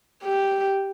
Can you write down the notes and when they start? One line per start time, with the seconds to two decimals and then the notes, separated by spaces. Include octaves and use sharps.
0.24 G4